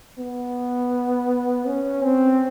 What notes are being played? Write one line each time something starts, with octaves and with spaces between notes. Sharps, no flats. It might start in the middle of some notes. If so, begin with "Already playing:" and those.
B3
C#4
C4